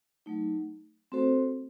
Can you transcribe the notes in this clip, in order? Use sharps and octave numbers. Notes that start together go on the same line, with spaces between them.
F#3 A3 D#4
A3 C4 F#4 A4 C5